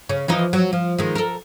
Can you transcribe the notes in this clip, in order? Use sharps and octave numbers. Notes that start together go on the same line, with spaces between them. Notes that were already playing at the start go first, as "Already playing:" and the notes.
C#3 C#4
E3 F3 D#4
F#3
F3
D#3 G#3
A4 A#4